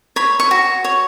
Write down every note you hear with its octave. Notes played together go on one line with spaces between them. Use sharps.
C#5 B5
C#6
F#4
C#5